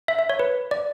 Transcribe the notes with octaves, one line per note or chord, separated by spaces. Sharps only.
E5
E5
C#5
B4
D5